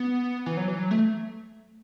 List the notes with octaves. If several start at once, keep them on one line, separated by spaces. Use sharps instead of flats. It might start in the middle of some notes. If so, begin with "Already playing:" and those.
Already playing: B3
E3
F#3
E3
F#3
A3